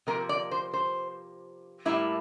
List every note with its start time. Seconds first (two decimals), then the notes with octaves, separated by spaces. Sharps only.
0.07 C3 F3 A#3 A#4
0.29 D5
0.51 C5
0.73 C5
1.85 A2 G3 A#3 E4